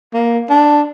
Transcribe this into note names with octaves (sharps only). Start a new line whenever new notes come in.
A#3
D4